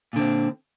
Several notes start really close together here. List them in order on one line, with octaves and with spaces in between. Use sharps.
A#2 D3 C4